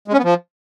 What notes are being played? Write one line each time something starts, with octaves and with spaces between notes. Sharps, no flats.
G#3
C#4
B3
F3